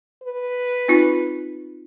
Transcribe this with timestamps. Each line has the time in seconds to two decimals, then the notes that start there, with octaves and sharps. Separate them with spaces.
0.23 B4
0.88 C4 D#4 F4